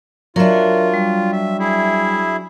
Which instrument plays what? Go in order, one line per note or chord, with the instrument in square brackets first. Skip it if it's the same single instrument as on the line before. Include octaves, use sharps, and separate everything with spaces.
[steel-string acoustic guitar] F#3 D4 [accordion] F4 [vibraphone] A#4 C#5 E5
[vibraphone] G3
[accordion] E5
E4 G#4 E5